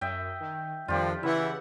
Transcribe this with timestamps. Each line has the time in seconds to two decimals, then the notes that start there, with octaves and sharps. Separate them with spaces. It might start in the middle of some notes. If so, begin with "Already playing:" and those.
0.01 F#2 D#5 E5 G5
0.40 D#3
0.88 F2 D#3 F3 G3 D4 F4 G4 D5
1.23 C#3 E3 E4 E5 F#5